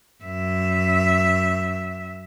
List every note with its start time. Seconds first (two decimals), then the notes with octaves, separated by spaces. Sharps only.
0.24 F#2 E5